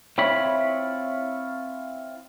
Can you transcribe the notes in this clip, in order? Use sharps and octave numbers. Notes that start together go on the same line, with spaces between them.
C4 E4 F4 C#5 B5